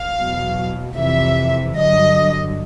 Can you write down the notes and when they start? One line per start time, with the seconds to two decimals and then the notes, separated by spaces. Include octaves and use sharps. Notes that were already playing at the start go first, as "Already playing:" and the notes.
Already playing: F5
0.17 E2 B2 F#3
0.97 F2 C3 E3 E5
1.77 G2 D3 F#3 D#5